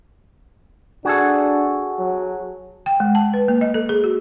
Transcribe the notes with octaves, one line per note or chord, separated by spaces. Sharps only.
D4 F#4 G#4 A4
F#3
G5
G#3
A5
B4
A#3
D#5
A4
G#4
F#4